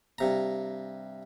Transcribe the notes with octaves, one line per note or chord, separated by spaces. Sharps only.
G2 C3 A#5